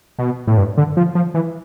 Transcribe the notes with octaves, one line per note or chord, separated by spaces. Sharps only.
B2
A2
G2
D3
F3
F3
E3